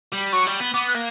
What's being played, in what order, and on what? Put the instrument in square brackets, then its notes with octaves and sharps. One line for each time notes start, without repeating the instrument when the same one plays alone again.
[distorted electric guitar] G3
[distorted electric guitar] F#3 [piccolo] C#6
[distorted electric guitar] G3
B3
[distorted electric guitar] B3 [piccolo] D6
[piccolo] F#6
[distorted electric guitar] A#3